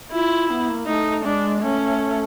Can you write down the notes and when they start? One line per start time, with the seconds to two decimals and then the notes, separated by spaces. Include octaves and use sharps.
0.13 E4 F4
0.50 B3
0.69 A#3
0.87 A3 D#4
1.25 G#3 D4
1.62 A3 C#4